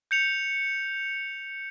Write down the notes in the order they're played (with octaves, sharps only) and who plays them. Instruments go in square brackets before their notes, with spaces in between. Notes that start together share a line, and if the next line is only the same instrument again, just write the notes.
[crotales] G6 C#7 F7